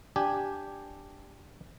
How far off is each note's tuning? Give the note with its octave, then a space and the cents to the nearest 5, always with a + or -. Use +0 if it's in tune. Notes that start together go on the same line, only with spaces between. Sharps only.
D4 +0 G4 +0 G#5 +0